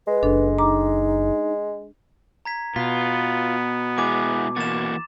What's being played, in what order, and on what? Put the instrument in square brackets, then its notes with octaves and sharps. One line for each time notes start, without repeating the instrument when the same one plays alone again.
[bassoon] G#3 [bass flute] B4
[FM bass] F#1 [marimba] D4 A4
[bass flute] D#4 [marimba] A#5 D6
[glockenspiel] A#5 G#6 B6
[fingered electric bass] B2 [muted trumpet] B3 [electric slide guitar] F4 [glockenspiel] B6
[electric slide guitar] G#3 E4 G#4 [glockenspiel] D6
[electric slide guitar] E3 A#3 F#4 [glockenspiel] A6 E7